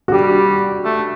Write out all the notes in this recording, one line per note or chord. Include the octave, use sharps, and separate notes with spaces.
F#4
G3 G4
A3